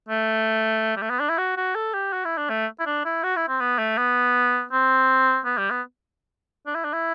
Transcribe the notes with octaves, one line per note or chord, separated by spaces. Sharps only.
A3
G3
A3
B3
D4
E4
F#4
F#4
A4
G4
F#4
E4
D4
A3
E4
D4
E4
F#4
E4
C4
B3
A3
B3
C4
B3
G3
B3
D4
E4
D4
E4